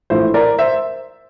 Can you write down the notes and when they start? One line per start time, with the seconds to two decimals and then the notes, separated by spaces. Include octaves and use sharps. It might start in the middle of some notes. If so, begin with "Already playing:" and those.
0.10 A#1 A2 E3 A3 E4 C5
0.34 A#4 D5
0.59 C5 E5